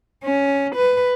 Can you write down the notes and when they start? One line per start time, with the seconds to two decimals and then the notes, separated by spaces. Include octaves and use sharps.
0.24 C#4
0.75 B4